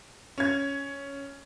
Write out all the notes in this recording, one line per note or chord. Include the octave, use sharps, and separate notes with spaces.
C#4 G#6